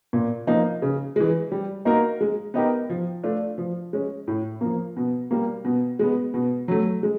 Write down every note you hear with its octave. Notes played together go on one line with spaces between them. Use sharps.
A#2
F3 A#3 D#4
C#3
E3 G#3
G3
A#3 D#4 F#4 A#4
G#3
B3 D#4 G4 A#4
F3
A3 D4 F4
F3
G#3 C#4
A2
F3 A#3
B2
G3 A#3
B2
G#3 B3
B2
F#3 A3
G#3